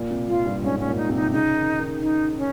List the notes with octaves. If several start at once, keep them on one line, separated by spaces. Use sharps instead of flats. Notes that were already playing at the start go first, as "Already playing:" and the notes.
Already playing: A#2
C3
A#2 F4
G2
G#2 C#4
G#2 C#4
A#2
D#4
C3
D#4
C#3 D#4
D#3
D#3
D#4
C#4